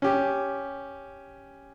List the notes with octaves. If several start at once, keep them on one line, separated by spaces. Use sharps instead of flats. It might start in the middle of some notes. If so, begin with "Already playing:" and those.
C#4 G4